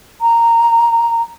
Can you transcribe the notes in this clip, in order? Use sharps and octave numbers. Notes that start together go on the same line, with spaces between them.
A#5